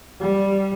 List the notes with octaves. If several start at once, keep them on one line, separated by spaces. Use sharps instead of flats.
G3